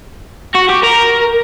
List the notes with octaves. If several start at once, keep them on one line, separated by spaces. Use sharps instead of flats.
F#4
G4
A#4